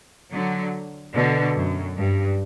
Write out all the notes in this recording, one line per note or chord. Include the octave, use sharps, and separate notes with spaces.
D3 F#3
B2 D3
F#2
G2